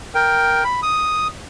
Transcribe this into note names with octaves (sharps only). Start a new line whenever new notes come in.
A#4 G5
B5
D#6